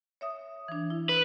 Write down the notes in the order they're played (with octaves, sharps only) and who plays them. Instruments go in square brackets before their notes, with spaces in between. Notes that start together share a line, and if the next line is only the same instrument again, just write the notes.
[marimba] C#5 E5 D#6
E3 D4
E4
[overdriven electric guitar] B4